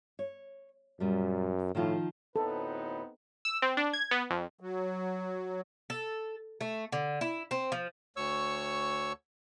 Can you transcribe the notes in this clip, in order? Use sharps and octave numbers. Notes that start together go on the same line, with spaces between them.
C#5
F#2 A#2 G3
A2 D#3 F3 F4
D2 A2 B3 C4 D#4 A4 B4
E6
C4
D4
G#6
B3
F2
F#3
A4
A3
D3
E4
C4
F3
D2 C#5 C#6 E6